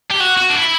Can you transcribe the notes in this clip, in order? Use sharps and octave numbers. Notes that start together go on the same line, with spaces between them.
G4
F#4
F#4
D4
E4